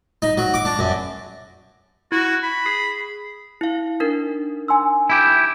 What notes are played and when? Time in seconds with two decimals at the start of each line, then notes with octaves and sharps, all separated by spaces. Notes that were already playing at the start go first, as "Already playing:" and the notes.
0.22 D#4
0.38 F#3
0.54 D6
0.65 D4
0.79 F#2
2.12 E4 F#4
2.43 B5
2.66 G#4
3.61 E4 F5
4.00 D4 D#4 A#4
4.68 G#5 C6 E6
5.10 E4 G4